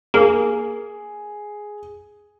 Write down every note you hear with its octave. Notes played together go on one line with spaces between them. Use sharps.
A#3 G#4